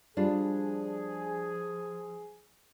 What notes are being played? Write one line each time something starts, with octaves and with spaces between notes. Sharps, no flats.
F3 G3 D4 F4 G#4